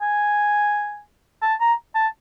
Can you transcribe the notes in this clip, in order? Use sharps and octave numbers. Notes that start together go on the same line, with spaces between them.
G#5
A5
A#5
A5